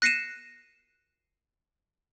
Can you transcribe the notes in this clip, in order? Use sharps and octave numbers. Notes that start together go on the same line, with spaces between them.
F#6 A#6 C7 C#7 D#7 E7